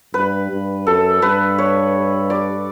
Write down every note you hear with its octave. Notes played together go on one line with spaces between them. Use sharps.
G2 B4
G2
F#2 A4
G2 B4
C#5
D5